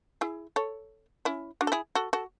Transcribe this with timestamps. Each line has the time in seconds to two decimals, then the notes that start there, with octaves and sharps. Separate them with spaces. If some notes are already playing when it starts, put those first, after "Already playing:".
0.21 E4 G#4
0.56 A4 C#5
1.25 C#4 E4
1.61 D4 F#4
1.67 A4
1.72 E4 G#4
1.95 F#4 A4
2.13 F#4 A4